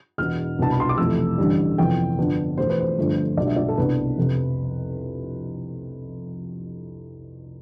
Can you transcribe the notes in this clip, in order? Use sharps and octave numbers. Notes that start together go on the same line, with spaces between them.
E1 E2 B2 F6
C2 B2 B3 D4 A5
B5
C6
D6
F2 C3 E3 A3 E6
A1 G2 D3 G3
F1 F2 E3 B3 G5
G1 G2 F3 B3 D4
E1 E2 B2 A3 C5
B4
C5
G1 G2 F3 A3
B1 B2 G3 D4 D5
E5
D5
A4
C2 B2 B3 D4 B4
F1 F2 C3